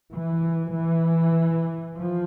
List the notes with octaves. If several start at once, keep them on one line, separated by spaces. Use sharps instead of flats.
E3
E3
F3